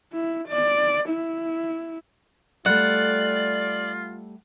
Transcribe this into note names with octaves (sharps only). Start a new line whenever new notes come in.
E4
D5
E4
G3 A3 F4 D5 F#5